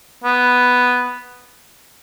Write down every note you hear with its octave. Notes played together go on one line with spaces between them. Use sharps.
B3